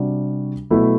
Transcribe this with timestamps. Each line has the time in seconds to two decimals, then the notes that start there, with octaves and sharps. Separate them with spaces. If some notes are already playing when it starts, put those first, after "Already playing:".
Already playing: C3 G3 D4 F#4
0.70 B2 F#3 A3 E4